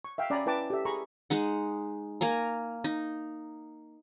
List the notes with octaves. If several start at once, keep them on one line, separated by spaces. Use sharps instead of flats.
C#6
E5 F5 G5
C#4 D5 G#5 A#5 B5
E4 B4 G5 A5 D6
G4 A4 E5
G#4 A#5 B5 C#6
G#3 D#4 F#5
A#3 G#5 A#5
D#4